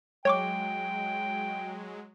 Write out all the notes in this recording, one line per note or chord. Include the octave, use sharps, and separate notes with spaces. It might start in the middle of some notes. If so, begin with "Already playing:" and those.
F#3 G#3 C#5 G5 C#6 D6